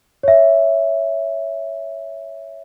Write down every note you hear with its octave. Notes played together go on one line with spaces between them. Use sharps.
C#5 E5